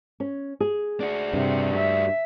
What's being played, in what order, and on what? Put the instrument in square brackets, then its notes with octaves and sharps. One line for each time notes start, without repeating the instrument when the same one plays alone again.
[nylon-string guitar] C#4
G#4
[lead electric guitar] D4 F#4
[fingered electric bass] G2 [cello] C3
[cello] E5